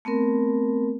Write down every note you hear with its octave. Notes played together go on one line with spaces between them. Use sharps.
A3 B3 C4 A#4